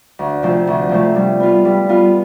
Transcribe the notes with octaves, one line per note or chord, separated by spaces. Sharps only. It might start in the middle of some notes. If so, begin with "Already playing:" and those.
D2
C3 F3 A3
D2
C3 F3 A3
G3
B3 F4
G3
B3 F4